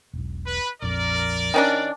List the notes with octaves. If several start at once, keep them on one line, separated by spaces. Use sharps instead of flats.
E1 B1
B4
A#1 F2 A#4 D5
D#3 C#4 D4